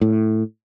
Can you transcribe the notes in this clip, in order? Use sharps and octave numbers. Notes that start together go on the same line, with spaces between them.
A2